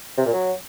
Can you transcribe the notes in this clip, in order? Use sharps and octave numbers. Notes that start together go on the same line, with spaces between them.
C3
A#2
F#3